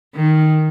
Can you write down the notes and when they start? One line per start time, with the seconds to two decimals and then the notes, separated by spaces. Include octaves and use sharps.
0.15 D#3